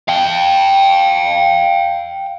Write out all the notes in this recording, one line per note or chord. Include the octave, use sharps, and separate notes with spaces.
F5 G5